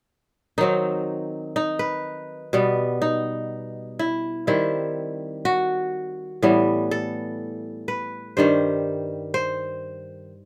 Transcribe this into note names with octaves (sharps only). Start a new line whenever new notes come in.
D#3 F#3 C4 D#4
D#4
B4
B2 G3 B3
D#4
E4
D#3 G3 C4 E4
F#4
A2 E3 G3 B3
A4
B4
G2 D#3 G3 C5
C5